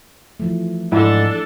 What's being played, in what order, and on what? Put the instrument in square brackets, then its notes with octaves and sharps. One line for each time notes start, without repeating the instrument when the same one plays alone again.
[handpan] E3 F3 A3
[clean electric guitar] G#2 [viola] D4 A4 [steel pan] E4